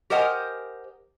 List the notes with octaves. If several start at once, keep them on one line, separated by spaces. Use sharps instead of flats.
G4 A#4 C5 D#5 F#5 G#5